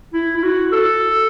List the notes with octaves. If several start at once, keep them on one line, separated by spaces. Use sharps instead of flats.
E4
E4
F#4
A4